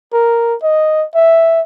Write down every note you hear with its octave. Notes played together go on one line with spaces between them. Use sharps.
A#4
D#5
E5